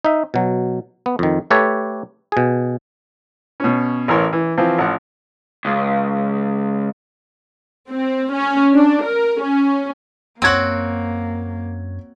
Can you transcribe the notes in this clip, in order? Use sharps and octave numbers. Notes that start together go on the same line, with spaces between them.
D#4 E5
B2 F#3
B3
F2 D#3
A3 G4 A4 B4 C#5
B2 G#4
B2 C#4
A1 E3 A#4 C#5 C6
E3
E3 F3 C4 F4
A1 F3 F#5
C#2
C4
C#4
D4
A#4
C#4
F#2 A#3 C4 F#4 C#5 G#6 F#7